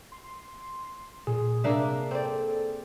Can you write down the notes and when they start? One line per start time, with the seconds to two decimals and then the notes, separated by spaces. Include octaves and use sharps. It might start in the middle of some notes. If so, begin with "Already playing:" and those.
0.12 C6
1.27 A#2 G#4
1.64 C3 A#3 D4 E5
2.11 C4 A4 D5